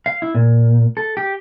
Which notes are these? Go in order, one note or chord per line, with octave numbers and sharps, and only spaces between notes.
F5
E4
A#2
A4
G4